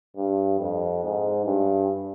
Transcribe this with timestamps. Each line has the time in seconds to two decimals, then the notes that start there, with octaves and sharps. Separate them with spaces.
0.17 G2
0.60 F2
1.04 G#2
1.46 G2